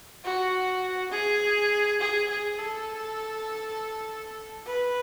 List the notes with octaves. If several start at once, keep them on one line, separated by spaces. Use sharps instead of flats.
F#4
G#4
G#4
G#4
A4
B4